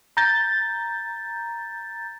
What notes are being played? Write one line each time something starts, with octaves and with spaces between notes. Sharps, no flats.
A#5 G6 A6